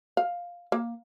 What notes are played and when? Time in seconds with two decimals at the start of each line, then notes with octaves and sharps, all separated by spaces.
0.17 F5
0.72 A#3